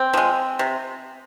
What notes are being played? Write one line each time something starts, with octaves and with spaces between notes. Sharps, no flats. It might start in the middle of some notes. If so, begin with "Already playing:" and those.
Already playing: C4
F3 G#3
C3